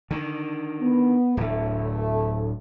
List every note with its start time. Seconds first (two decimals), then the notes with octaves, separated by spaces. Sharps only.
0.11 D3 D#3
0.80 B3
1.37 D1 D3 A3